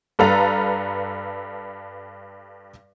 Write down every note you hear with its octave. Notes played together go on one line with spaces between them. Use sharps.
G2 A4 B4 F5 A#5